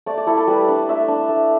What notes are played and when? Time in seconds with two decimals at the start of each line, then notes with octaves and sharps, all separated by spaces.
0.06 A3 D5
0.17 D5
0.27 E4 A4
0.37 A4
0.47 G3 B4
0.68 D4
0.89 A3 E5
1.08 D4
1.29 A3